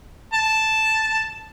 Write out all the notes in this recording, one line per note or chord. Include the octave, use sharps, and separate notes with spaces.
A5